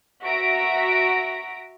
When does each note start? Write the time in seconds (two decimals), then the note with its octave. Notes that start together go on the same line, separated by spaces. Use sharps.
0.22 F#4 E5 A#5 A#6 B6 D7